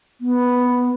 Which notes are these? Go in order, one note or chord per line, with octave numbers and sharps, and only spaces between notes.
B3